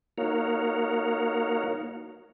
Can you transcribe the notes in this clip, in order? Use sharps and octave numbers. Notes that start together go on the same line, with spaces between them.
A#3 D#4 F#4 A#4 C#5 F5